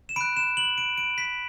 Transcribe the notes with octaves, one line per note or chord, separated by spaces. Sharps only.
E7
B5 F#6 D7
E7
F#7
D7
D7
B6